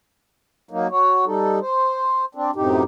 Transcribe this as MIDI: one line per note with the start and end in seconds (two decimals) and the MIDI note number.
0.71 0.87 54
0.71 0.87 58
0.71 0.87 63
0.91 1.25 66
0.91 1.25 73
1.26 1.59 55
1.26 1.59 63
1.26 1.59 69
1.61 2.25 72
2.35 2.51 60
2.35 2.51 62
2.56 2.83 42
2.56 2.83 45
2.56 2.83 48
2.56 2.83 63
2.56 2.83 67